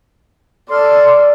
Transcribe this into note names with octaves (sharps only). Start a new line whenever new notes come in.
A4 D5 C6 F6